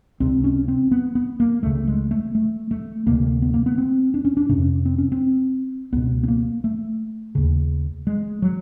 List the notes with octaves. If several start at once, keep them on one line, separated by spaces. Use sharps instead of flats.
C#2 C3 C4
C#4
C4
B3
B3
A#3
C#2 C#3 A3
G#3
A3
A3
A3
D2 C3 A#3
B3
A#3
B3
C4
D4
C#4
D4
F2 C3 C#4
C4
C#4
C4
C#2 B2 B3
B3
A#3
A3
D#2 C#3
G#3
F#3